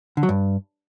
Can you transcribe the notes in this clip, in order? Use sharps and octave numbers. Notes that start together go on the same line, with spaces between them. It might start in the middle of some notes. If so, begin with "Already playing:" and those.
D3
F#3
G2